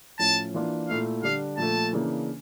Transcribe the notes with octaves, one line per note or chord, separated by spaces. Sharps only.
A2 F3 C#4 A5
E3 A#3 D4 F4
A#2 A3 E4 F5
D3 G3 D4 F5
A#2 F3 A3 A5
C#3 E3 A#3 D4